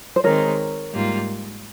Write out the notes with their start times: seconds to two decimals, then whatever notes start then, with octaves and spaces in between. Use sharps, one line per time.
0.16 C5
0.24 D#3 G#3 C4 D#4 A#4 C#5
0.94 G#2 G3 A#3 F4